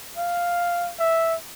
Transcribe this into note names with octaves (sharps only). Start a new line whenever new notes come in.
F5
E5